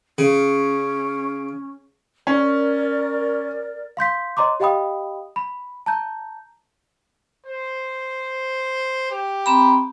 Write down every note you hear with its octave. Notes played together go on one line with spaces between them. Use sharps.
C#3 C#4
C#4 A#4 D5
F5 C6 G6 B6
C#5 D#5 A#5 C6 D6
G4 D#5 F5 G5 B5 D#6
B5
A5 A#5 G6
C5
G4
C4 A#5 B5